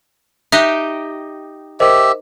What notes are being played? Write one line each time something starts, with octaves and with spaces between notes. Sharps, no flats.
D#4 G4 D#5 E5 F#6
G4 A#4 C5 D#5 E5